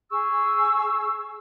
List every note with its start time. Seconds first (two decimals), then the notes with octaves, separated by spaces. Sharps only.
0.11 G#4 C#6 E6